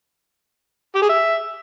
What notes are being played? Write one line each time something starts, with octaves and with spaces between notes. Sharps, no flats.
G4
G#4
E5